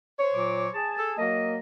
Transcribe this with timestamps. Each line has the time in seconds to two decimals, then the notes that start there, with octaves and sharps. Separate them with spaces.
0.19 C5 C#5
0.34 A#2 F#3 D6
0.74 G#4 A5
0.97 A4
1.18 F#3 A#3 D#5